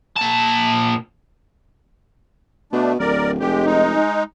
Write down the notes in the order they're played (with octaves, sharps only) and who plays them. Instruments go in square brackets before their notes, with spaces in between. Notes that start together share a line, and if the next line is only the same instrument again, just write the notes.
[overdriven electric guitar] A#2 A5
[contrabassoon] B2 [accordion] A3 D4
[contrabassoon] D1 [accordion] A#4 D5
[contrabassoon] F1 [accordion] G#3 G4
[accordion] G#3 D#4